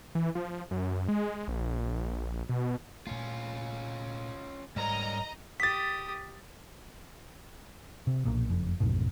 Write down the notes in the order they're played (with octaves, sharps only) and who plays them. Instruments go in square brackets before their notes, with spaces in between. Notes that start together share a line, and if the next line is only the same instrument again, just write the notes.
[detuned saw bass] E3
F3
F#2
G#3
A#1
B2
[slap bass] A#2 A3 [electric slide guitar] C#4 F4
[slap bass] G#2 [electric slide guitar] G3 A#4 C#5 [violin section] D#5 A#5
[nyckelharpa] G4 D#6 [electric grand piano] A6 B6
[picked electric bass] C3
B1 A#2
F#1 F2
A#1 F2 G#2 B2